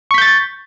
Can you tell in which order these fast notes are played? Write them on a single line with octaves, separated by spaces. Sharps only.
C#6 B6 G6 A6